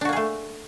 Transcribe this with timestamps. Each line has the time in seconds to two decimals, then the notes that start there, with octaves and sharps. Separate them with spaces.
0.01 D4
0.05 F#4
0.09 A#3
0.13 G#4
0.16 A3